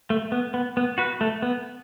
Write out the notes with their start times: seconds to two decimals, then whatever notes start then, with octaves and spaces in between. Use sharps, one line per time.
0.10 A3
0.32 B3
0.54 B3
0.77 B3
0.98 F#4 B4
1.21 A3
1.42 B3